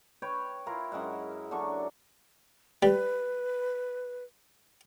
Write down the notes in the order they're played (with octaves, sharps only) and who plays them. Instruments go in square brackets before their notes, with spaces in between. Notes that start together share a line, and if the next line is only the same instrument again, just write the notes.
[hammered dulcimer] B4 C#5 G5
E4 F4 A#4
F#2 G#3 E5 F#5
D3 F#3 D4 C#6
[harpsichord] G3 [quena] B4